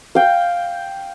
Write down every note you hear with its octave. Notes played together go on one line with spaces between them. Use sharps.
F5 G5